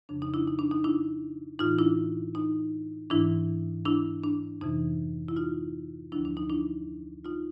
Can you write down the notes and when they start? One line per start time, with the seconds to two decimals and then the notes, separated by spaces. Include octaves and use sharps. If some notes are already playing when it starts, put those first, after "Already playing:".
0.09 F2 C#3 F3 D4
0.22 D#4
0.34 D4 E4
0.47 D#4
0.59 D4
0.71 D#4
0.84 D4 E4
1.59 A2 E3 D#4 F4
1.79 D4 E4
2.35 D#4
3.10 G#2 E3 D4 E4
3.86 D4 E4
4.23 D4
4.61 F2 C3 E3 D#4
5.28 E4
5.36 D#4 F4
6.12 D2 D3 F3 D4 E4
6.25 D4
6.37 D#4
6.50 D4 E4
7.25 D#4 F4